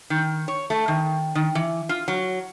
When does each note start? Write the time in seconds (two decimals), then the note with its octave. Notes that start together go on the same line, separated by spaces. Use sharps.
0.10 D#3
0.48 C#5
0.70 A3
0.88 D#3
1.35 D#3
1.55 E3
1.89 F4
2.08 F#3